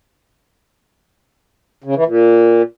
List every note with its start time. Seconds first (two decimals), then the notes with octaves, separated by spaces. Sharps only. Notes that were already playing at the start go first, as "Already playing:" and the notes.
1.84 C#3
1.95 E3
2.06 A#2